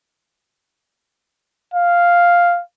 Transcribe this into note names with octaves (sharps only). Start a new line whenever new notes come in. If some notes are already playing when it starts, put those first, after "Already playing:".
F5